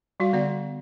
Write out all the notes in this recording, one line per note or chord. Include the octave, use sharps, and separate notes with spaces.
G3 F#4 F5
D3 B3 D5 F#5